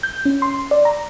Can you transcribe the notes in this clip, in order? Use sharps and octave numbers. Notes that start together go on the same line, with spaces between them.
G6
C#4
C6
D5
A#5